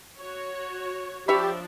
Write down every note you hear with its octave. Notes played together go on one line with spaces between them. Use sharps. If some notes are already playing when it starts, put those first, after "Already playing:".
F#4 C#5
F3 D4 G4 C#5 E5 B5